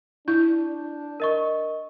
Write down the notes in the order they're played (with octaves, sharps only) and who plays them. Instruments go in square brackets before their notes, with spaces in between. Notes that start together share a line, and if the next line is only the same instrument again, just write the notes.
[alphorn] D4 [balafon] E4 [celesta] G6
[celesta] A#4 D#5 C#6